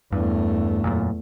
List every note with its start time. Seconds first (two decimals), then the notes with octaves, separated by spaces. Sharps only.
0.12 E2 G2 A3
0.85 F#2 A#2